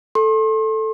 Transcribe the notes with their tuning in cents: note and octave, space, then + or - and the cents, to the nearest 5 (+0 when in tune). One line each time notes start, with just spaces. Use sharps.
A4 +0 C6 +40